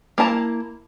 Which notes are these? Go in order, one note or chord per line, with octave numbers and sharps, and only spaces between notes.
A#3 E4 A5 A#5